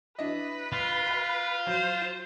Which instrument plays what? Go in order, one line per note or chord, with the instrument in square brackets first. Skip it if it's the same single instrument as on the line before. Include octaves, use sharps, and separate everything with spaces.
[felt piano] D4 E4 D#5 [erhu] B4
[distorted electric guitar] F4
[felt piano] F5 B5
[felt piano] F#3 [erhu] C5